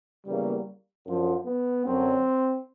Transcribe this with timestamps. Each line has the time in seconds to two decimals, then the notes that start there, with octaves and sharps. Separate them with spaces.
0.26 E2 C#3 F#3 G3 A#3
1.06 F#2 D3 F3
1.45 B3
1.85 F#2 D3 F#3 C4